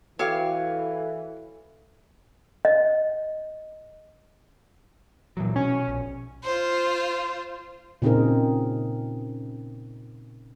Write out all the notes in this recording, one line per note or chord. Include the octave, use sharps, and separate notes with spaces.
E3 F#4 A4 C#5 F5 G5 D6
D#5
A#2 E3 F#3
B2 C#4
A#1
F4 C5
A#2 C#3 C4 D#4 G#4 A#4